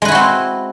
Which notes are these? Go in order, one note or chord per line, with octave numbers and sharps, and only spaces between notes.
G#3 C4 E4 F#4 B4